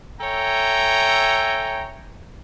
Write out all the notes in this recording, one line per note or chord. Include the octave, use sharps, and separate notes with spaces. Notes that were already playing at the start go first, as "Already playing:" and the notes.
A4 C#5 E5 G5 G#5 A#5